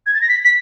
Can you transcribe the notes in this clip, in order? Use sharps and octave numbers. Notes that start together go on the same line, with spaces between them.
G#6
A6
A#6
B6
B6